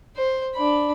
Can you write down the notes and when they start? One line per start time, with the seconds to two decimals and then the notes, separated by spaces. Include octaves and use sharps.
0.16 C5
0.55 D4 B5